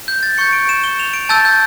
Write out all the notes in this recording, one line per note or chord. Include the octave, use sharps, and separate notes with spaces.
G6
A6
C#6 G6 C#7
D7
E7
G7
F7
D7
A5 E6 G6 A6
G6